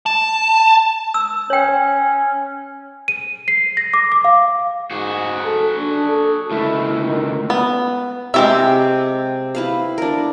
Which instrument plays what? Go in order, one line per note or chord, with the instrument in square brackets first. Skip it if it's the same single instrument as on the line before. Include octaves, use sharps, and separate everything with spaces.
[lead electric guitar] A5
[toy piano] E6
[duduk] C#4 [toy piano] C#5 G5
[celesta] D#7
C7
A#6
D6
D6
F5
[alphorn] G#2 [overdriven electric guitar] F#4 G#4
[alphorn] A4
D4
A4
[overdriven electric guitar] C#2 A3 [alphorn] E4
[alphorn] D#3
[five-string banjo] B3
[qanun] C3 [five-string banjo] G#3 G4 E5
[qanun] E4 B4 F5
D4 A#4